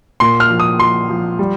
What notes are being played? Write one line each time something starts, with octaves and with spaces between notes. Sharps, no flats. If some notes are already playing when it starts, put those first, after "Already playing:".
A#2 C6
F6
F3
D#6
F3 C6
F3
G3